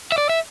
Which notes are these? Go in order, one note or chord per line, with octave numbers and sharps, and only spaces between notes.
E5
D5
E5